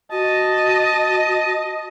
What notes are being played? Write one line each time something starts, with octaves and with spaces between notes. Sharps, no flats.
F#4 D#5 A5